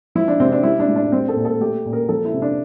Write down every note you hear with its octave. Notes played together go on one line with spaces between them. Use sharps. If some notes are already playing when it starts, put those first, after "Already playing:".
F3 E4
D4
C3 C4
D4
G3 E4
D4
A2
D4
G3 C4
A4
A#2
A4
A3 G4
A#2
A#4
F3 A4
E4
C3
D4